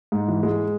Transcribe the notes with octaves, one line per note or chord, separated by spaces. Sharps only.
G#2
E3
G#3